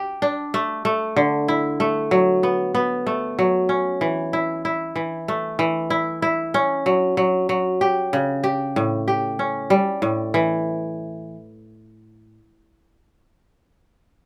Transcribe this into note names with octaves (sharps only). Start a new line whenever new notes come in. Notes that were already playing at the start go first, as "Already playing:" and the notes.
Already playing: G4
D4
A3
A3
D3
E4
A3
F#3
B3
B3
A3
F#3
C#4
E3
E4
E4
E3
A3
E3
E4
E4
C#4
F#3
F#3
F#3
G4
C#3
G4
A2
G4
C#4
G3
A2
E3